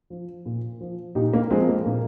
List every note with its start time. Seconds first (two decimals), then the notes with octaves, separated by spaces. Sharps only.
0.10 F3
0.46 A#2
0.80 F3
1.15 A#2 D#4 G4
1.33 A#3
1.50 F3 G#3 C4
1.69 A#3
1.86 A#2 A#3